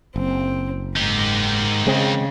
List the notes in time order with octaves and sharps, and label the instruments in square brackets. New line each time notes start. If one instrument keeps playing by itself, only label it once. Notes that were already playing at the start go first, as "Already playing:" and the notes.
[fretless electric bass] F#1 [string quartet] C4
[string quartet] G#2 [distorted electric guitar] D#3 G4
[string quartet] C#3 [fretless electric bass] G#3 C4